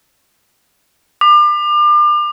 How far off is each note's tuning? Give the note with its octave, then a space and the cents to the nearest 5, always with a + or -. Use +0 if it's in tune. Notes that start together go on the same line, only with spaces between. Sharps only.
D6 +35